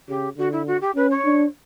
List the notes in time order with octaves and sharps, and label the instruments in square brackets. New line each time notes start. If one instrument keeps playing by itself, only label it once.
[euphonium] C#3 [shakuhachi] G4
[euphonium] D3 [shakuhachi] F#4
[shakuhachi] E4
F#4
G4
[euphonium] C#4 [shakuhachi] B4
[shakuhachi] C#5
[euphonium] D4